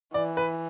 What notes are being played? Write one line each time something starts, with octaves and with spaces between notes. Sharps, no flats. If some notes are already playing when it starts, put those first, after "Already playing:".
E3 D5
B4